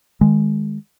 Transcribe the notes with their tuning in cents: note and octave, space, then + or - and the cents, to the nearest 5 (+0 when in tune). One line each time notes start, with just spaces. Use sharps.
D#3 +0 G#3 +0